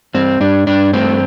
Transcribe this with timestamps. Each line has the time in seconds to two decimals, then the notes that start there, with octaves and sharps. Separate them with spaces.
0.14 G2 C4
0.40 G2 D4
0.67 G2 D4
0.93 A3 C4